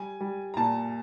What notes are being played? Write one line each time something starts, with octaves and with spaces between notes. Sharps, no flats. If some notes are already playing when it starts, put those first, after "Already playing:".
Already playing: G3 G#5
G3
A#5
A#2 A5